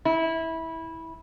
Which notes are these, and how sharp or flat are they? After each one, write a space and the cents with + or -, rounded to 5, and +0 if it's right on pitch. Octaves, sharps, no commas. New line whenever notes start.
E4 -15